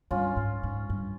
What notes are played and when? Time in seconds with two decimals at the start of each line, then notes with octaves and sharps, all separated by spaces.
0.11 G2 C#4 F4
0.36 G#2
0.63 G#2
0.90 G2